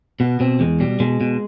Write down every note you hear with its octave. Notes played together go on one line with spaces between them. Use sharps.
B2 B3
B2 C4
E2 G#3
B2 G3
B2 G#3
B2